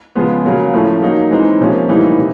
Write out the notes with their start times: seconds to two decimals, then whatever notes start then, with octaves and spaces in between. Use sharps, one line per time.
0.15 C#3 F3 G#3 B3
0.44 C#3 F#3 A#3
0.73 A2 F3 A3 C#4
1.02 F#3 A#3 D#4
1.31 E3 G#3 C4 D#4
1.60 C3 F3 A#3 C#4
1.89 A2 E3 G3 A#3 D#4
2.18 C3